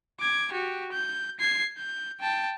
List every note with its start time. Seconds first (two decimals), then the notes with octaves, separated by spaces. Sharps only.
0.20 D6 G#6
0.52 F#4 G4
0.92 G6
1.40 G#6 C7
1.77 G6
2.21 G5 A5